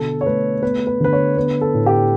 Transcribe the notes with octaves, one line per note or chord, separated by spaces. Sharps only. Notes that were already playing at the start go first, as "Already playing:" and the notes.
Already playing: B2 D3 A4
C#5
A3 B4
B3 B4
B4
D3 B4
C#5
B3 B4
A4
A2
G4